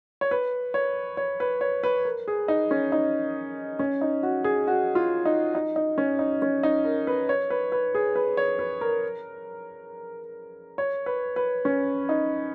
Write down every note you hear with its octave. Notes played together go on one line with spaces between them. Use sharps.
C#5
B4
C#5
C#5
B4
C#5
B4
A#4
G#4
D#4
C#4
D#4
C#4
D#4
F#4
G#4
F#4
F4
D#4
D#4
D#4
C#4
D#4
C#4
D#4
A#4
B4
C#5
B4
B4
G#4
B4
C#5
B4
A#4
C#5
B4
B4
C#4
D#4